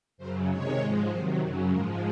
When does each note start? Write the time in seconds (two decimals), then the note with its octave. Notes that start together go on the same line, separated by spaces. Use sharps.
0.18 F#2 C#3 F#3 C5
0.48 C3 D#3 G#3 C#5
0.78 G#2 F3 G#3
1.08 C3 D#3 F#3 C5
1.39 F#2 C#3 F#3
1.69 G#2 F3 G#3 A#4